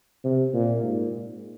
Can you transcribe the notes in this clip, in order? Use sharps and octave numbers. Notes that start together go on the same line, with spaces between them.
C3
A#2
G#2